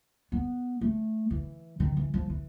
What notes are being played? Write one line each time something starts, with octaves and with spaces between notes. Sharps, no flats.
B3
A3
E3
D#3
E3
F3
E3